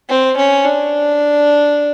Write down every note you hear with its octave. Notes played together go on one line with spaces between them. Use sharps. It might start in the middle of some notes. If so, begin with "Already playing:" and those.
C4
C#4
D4